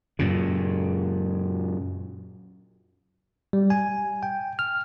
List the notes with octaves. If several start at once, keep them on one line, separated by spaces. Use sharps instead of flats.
F#2 A#2 C#3
G3
G#5
G5
F6